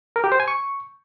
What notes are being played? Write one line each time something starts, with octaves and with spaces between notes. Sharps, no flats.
A#4
G4
C5
G#5
C#6